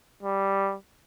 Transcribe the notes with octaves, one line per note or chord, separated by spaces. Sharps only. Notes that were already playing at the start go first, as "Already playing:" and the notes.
G3